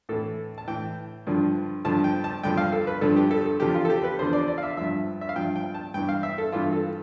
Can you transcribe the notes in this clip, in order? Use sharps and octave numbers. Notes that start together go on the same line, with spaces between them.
A2 E3 A4
A5
A2 E3 G5
G2 D3 F3
G2 D3 F3 A5
G5
A5
G2 D3 F3 G5
F5
A4
B4
G2 D3 F3 A4
G4
A4
A4
E2 D3 F3 G4
F4
A4
G4
B4
E2 D3 F3 C5
D5
D5
F5
E5
G2 F3 E5
E5
F5
G2 F3 G5
G5
A5
G2 E3 G5
F5
E5
A4
G2 E3 F4
A4